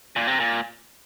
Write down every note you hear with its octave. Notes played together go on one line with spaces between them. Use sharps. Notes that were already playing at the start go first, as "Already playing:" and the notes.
A#2
C3
A#2